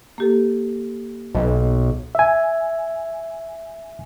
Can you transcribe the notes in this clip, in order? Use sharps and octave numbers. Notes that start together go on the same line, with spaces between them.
A#3 G4 A4
B1 B4 D#5
E5 G#5